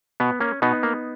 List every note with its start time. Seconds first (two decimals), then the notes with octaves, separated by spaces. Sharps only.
0.20 B2 B3
0.40 A#3 C#4
0.62 B2 B3 D#4
0.83 A#3